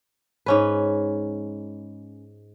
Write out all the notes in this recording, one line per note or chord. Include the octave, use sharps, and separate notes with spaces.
G#2 C#4 B4